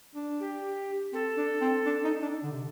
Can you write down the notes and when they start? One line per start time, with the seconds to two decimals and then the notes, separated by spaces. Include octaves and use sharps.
0.15 D4
0.40 G4
1.12 C4 A4
1.37 D4
1.61 C4
1.86 D4
2.04 D#4
2.22 D4
2.43 D3
2.52 C3